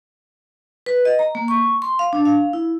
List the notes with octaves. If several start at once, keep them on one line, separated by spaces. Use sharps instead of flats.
B4
D#5
A#5
A#3
C#6
C6
F5
D4
F5
E4